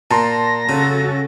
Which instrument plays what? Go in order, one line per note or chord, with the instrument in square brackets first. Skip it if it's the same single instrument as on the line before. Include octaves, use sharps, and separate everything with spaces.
[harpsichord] A#2 [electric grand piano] A5 A#5 C6 [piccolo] A#6
[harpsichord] C#3 [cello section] C#4 F#4 A4